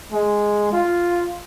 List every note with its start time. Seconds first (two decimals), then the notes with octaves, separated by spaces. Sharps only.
0.12 G#3
0.72 F4